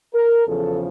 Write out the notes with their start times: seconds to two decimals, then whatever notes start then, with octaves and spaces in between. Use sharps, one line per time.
0.14 A#4
0.46 E2 C#3 F3 A4